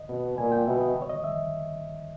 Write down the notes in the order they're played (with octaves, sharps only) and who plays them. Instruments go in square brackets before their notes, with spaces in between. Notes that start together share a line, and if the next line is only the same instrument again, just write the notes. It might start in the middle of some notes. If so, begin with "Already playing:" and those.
Already playing: [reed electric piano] D#5
[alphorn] B2
[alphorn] A#2 [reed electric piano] G#5
[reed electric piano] G5
[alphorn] B2 [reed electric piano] E5
[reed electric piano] D#5
C#5
D#5
E5